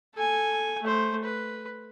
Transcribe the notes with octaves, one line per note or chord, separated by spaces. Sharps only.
A4 G#5
A3 C5
B4